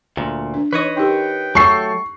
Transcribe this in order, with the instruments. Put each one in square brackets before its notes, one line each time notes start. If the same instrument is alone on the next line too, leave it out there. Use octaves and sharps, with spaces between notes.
[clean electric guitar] D2 A#2
[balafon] D4
[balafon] E3 D#4 [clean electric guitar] B4 C#5 D#5
[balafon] D#4 G4 A#4 [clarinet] G5
[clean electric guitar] F#3 A3 A4 [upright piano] C#6 C7